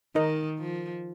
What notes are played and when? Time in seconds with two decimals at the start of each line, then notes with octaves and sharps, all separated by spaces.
0.15 D#3 D#4 A#4 D#5
0.59 F3